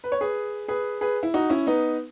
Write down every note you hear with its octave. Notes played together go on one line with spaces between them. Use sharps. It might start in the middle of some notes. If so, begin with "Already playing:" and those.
B4
C#5
G#4 B4
G#4 B4
G#4 B4
E4
D#4 F#4
C#4 E4
B3 D#4